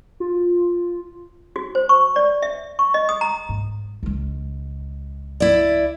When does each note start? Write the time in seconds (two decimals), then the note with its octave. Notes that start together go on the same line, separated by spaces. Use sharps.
0.20 F4
1.56 F#4
1.75 C5
1.89 C#6
2.16 D5
2.42 E5
2.79 C#6
2.94 D#5
3.09 D#6
3.21 A#5
3.49 G#2
4.03 C#2 G#3
5.40 E4 D5